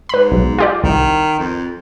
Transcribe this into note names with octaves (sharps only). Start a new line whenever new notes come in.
G#2 B4 B5
B1
F4 G4 D5
C2 D#3
F2